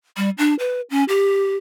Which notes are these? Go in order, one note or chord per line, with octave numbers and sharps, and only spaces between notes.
G3
D4
B4
C#4
G4